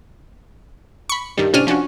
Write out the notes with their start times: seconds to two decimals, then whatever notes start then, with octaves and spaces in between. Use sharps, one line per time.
1.09 B5 C#6
1.37 G2 D#3 G3
1.53 A2 C3 C#4 D4 F6 D#7
1.67 F3 C#4 D4 F#4